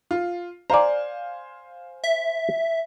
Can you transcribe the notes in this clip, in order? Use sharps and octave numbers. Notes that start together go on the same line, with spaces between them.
F4
C5 D5 F5 G#5 A#5
E5